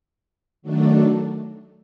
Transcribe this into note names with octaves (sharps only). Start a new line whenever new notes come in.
D#3 F#3 A3 D4